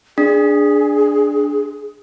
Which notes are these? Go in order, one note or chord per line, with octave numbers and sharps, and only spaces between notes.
D4 G#4